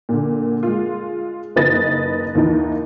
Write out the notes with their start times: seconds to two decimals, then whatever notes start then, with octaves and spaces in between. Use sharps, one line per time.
0.09 A#2 D3
0.63 G#3 F4
1.56 F#1 D#3 B4 D#5 A6 A#6
2.35 D#2 D#3 E3 D#4